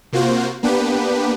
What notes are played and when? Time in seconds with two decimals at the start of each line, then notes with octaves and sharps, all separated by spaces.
0.13 C3 A#3 F4 F#4 C5
0.63 A#3 B3 D4 G4 B4